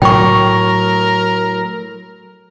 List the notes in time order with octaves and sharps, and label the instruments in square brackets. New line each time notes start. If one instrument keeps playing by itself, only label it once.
[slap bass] A2 F#3 [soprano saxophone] A#4 [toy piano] G5 C#6